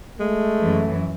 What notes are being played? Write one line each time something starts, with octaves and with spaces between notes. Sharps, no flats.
G#3 A3
F#2 E3